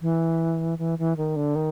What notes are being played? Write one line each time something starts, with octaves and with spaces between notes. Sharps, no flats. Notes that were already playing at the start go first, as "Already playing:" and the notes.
E3
E3
E3
D#3
D3
D#3